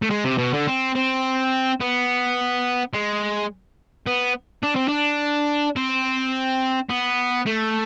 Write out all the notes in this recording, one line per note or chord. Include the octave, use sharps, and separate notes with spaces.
A3
G#3
C3
B2
D3
C4
C4
B3
G#3
B3
D4
C4
D4
C4
B3
A3